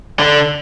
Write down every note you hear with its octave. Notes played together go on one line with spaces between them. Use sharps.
D3